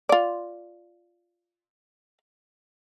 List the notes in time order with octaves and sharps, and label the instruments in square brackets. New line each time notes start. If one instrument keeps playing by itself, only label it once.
[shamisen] F4 D5